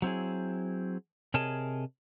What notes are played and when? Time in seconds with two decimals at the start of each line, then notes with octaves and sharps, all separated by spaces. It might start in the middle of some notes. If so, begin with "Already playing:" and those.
0.02 F#3 C4 E4 G#4
1.34 C3 G#4 A#4 C#5 D#5 A5